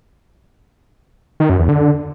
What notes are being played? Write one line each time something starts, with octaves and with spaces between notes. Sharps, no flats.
D#3
F#2
E2
D3